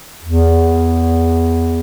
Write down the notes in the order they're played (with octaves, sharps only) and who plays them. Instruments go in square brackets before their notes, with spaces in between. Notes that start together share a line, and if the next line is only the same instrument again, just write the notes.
[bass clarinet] E2